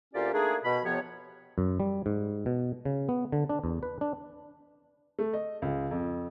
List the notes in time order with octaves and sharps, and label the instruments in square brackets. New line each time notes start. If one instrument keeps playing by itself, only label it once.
[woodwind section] D2 A#3 C#4 F4 G4 D5
A3 A#3 D4 D#4 G#4
B2 B5
F2 C3 F3 B3 C#5
[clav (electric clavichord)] F#2
G3
G#2
B2
C#3
B3
D3
D4
E2
B4
D4
[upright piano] A3
D#5
C#2
F2